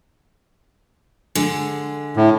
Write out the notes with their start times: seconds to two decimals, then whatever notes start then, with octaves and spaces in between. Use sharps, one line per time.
1.35 D3 G#3
2.17 A2